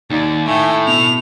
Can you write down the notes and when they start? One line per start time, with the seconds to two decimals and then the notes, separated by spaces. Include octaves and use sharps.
0.10 D#2 D#3 D#4 D5
0.47 A2 A3 G5 G#5
0.88 B2 F7